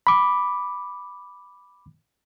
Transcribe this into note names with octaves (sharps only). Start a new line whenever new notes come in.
B5 D6